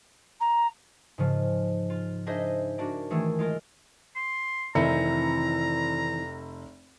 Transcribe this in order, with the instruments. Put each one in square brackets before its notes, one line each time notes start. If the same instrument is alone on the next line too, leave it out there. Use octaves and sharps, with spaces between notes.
[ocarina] A#5
[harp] G#2 C#3 F3
F4
D4 D#4 G#4 C5 D#5 E5
A#3 D4 F#4
D#3 E3 A3 G#4
G#3 F4 A#4
[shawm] C6
[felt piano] F1 E5 C#7 [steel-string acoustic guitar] D#3 E3 C4 [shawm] A#5